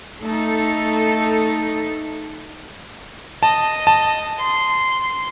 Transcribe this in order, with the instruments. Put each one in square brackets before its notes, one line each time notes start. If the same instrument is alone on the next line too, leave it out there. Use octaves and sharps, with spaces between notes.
[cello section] A3 D#4 A4
[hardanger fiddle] D#5 [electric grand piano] A5
[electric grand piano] A5
[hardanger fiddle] C6